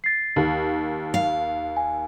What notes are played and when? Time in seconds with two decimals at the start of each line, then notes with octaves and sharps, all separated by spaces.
0.04 A6 C7
0.36 D#2
1.14 F5
1.77 G#5